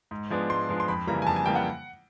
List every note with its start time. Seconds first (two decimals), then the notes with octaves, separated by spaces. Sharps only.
0.11 G#2
0.30 F3 G#3 B3 D4
0.49 G#2 C6
0.69 F3 G#3 B3 D4
0.80 C6
0.88 F2 B5
1.07 C#3 E3 G3 A#3 A#5
1.22 G#5
1.27 F2 A5
1.36 G#5
1.46 C#3 E3 G3 A#3 G5
1.55 F#5